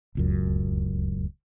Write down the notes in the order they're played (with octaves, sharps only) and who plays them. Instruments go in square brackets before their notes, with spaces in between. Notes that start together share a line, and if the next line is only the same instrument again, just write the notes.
[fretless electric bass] D1 C#2 F#2